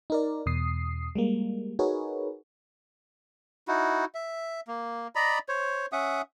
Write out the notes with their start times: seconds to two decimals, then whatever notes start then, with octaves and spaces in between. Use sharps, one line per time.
0.10 D#4 A#4 D5
0.46 E2 B2 D#6 C7
1.15 G3 G#3 A#3
1.79 D#4 F#4 G#4 A#4 B4 C#5
3.68 D#4 E4 F#4
4.15 E5
4.68 A#3
5.15 D5 D#5 A#5 B5
5.49 C5 C#5
5.92 C#4 E5 F#5 D#6